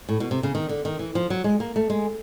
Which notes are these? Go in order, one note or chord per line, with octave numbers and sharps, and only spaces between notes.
A2
B2
C3
C#3
D#3
D3
D#3
E3
F3
F#3
G#3
A#3
A3
G#3